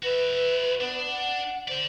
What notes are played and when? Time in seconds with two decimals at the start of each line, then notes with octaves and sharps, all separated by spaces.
0.03 F#4 B4 E5
0.81 B3 D4
1.10 F#5
1.68 A4 C5 D5